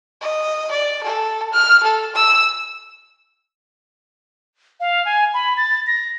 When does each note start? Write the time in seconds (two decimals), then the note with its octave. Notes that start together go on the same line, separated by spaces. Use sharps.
0.21 D#5
0.71 D5
1.04 A4
1.53 F6
1.83 A4
2.15 E6
4.80 F5
5.05 G#5
5.34 B5
5.57 A6
5.87 A#6